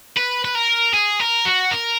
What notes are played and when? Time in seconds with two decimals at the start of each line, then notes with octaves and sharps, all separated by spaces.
0.17 B4
0.45 B4
0.55 A#4
0.93 G#4
1.20 A#4
1.45 F#4
1.71 A#4